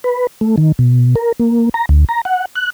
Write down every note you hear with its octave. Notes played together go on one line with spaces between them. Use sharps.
B4
A3
D#3
B2
A#4
A#3
A#5
D2
A#5
F#5
F#6